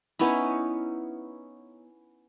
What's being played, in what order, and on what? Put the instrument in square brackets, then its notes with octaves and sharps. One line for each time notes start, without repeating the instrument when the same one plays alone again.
[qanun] B3 C#4 D#4 E4